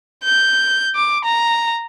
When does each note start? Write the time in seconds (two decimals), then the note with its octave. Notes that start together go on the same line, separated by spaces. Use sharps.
0.24 G6
0.96 D6
1.25 A#5